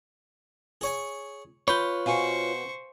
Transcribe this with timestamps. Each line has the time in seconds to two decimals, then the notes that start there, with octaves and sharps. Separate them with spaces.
0.81 G#4 C#5 G#5
1.68 F4 B4 C#5 B5 C6 G6 G7
2.06 B2 C5 F5 G#5 C#6